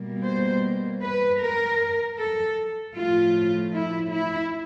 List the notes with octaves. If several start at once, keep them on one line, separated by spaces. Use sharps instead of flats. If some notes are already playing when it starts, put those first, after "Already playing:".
Already playing: B2 G3 A#3
C5
B4
A#4
A4
A2 F3 A3 F4
E4
E4